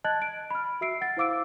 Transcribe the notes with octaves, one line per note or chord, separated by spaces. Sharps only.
D#5 A5 F#6 G#6 A6 F#7
D7
B5 F6
F#4 E5 E6 C7 D7
F#5 A6
E4 C5 F5 D6 E6 D7